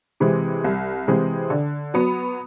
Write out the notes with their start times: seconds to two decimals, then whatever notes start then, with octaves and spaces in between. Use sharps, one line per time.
0.20 C3 E3 G#3 C4
0.64 C2
1.08 C3 E3 G#3 C4
1.50 D3
1.94 F#3 B3